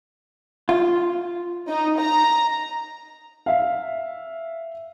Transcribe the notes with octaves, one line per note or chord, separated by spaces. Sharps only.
F4
D#4
A#5
E5 F5